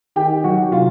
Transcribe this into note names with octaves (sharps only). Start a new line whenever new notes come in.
D#3 G4 G5
F#3 F#4 F#5
C3 F4 F5